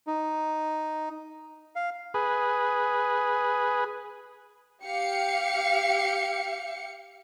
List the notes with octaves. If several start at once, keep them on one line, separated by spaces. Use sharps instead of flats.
D#4
F5
G#4 B4
G4 F5 C#7